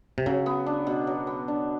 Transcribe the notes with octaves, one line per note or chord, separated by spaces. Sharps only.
C3
C#3 F#3
B3
D4
B2
F#3
B3
D4